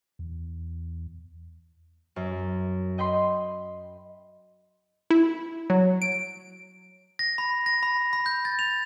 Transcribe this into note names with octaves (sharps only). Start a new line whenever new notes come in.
E2
F#2
D#5 G5 B5 C6
E4
F#3
D7
A#6
B5
A#6
B5
B5
G6
A6
F7